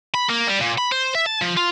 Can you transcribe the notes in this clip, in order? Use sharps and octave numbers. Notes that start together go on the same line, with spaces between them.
B5
A#3
G3
A#2
B5
C5
E5
A5
F3
F4